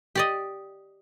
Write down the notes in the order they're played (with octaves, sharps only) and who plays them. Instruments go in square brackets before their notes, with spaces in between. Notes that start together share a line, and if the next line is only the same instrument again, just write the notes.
[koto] G4 D5 D#5